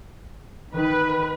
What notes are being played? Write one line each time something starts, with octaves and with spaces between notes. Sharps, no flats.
D#3 B4